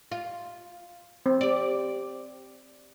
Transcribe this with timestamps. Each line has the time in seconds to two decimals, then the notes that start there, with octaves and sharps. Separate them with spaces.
0.12 F4
1.26 C4
1.41 G4 D5